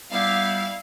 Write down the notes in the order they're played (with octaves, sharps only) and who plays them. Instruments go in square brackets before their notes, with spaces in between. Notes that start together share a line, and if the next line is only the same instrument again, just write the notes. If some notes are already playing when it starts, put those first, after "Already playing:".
[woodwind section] G3 B3 [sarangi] E4 [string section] F5